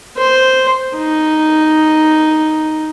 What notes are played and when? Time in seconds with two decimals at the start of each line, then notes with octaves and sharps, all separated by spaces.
0.17 C5
0.97 D#4